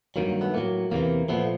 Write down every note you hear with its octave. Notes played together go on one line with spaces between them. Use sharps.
G2 D#3 F#3 A#3
A#3
A3 B3
A2 F#3 A#3
E2 C3 E3 A#3
A#2 F3 A3 B3